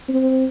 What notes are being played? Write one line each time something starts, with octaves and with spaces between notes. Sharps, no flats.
C4